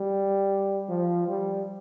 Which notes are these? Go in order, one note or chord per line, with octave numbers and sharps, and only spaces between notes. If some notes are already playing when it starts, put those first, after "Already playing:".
Already playing: G3
F3
G3